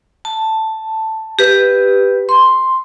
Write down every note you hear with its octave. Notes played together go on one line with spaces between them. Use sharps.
A5
G4 B4
C6